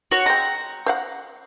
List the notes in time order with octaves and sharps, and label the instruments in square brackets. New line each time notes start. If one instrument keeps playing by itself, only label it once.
[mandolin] F#4 C#5
[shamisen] G#3 C4 [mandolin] A#5
[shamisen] C5 F5 F#5